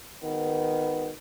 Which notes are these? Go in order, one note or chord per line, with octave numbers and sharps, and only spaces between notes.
G#1 D#3 B3 B4